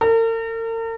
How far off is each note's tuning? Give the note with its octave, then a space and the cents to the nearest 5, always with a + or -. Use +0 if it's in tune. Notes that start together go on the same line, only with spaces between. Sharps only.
A#4 -45